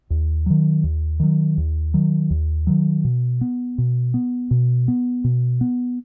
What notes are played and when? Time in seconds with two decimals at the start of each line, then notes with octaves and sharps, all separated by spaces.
0.10 D#2
0.46 D#3 F#3
0.84 D#2
1.20 D#3 F#3
1.57 D#2
1.94 D#3 F#3
2.30 D#2
2.67 D#3 F#3
3.04 B2
3.41 B3
3.78 B2
4.14 B3
4.51 B2
4.88 B3
5.24 B2
5.61 B3